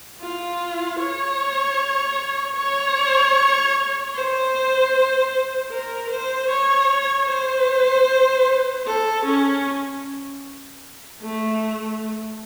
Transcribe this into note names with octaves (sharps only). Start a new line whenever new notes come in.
F4
C#5
C#5
C5
A#4
C5
C#5
C5
A4
C#4
A3